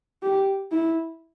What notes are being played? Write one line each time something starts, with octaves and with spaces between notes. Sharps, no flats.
G4
E4